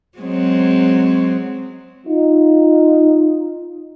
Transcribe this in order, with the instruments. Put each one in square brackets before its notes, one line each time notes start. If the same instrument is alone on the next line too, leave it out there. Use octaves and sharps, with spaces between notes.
[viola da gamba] F#3 G#3 C4
[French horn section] D#4 F4